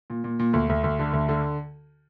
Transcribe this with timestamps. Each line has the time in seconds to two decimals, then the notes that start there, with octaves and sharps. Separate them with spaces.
0.10 A#2
0.24 A#2
0.39 A#2
0.53 D2
0.69 D2
0.84 D2
0.99 D3
1.13 D2
1.29 D3